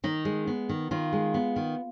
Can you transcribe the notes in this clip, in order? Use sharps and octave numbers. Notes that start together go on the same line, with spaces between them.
D#3 D#4
G#3
B3
D#3
D#3 F4
G#3
B3
D#3